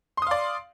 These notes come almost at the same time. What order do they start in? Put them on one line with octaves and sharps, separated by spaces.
C6 D#6 F5 D5